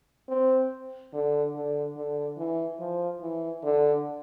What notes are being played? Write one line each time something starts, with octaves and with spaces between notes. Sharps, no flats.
C4
D3
D3
D3
E3
F3
E3
D3